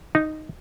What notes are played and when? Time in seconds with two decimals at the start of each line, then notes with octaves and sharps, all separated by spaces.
0.15 D#4